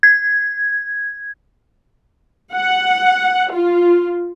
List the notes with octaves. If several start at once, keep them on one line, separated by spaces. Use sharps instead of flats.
G#6
F#5
F4